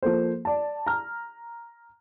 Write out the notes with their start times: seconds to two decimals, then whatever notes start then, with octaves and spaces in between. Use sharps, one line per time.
0.03 F3 A#3 A4 C5
0.45 D5 A5
0.86 A#5 F6